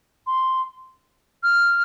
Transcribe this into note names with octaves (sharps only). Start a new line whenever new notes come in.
C6
F6